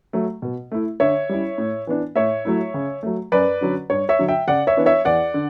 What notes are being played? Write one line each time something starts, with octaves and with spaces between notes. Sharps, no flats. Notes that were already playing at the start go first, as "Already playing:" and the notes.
F#3 A3
B2
A3 E4
D3 C#5 E5
G3 C#4 E4
A2
E3 B3 D4
A2 C#5 E5
F#3 A3 E4
C#3
F#3 A3
F#2 B4 D5
D3 F#3 C#4
G2 C#5
C#5 E5
D3 F#3
E5 G5
C#3 D5 F#5
C#5 E5
E3 B3 D4
C#5 E5
E2 D5 F#5
D3